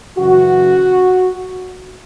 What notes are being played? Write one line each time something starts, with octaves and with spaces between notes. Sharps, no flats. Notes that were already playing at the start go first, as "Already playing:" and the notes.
F#2 C#3 E3 F#4